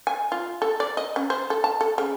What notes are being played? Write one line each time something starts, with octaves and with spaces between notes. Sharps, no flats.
G#5
F4
A4
D5
D#5
C#4
C5
A4
A5
A4
C#3